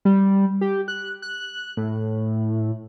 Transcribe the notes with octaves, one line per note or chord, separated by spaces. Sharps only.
G3
G4
F#6
F#6
A2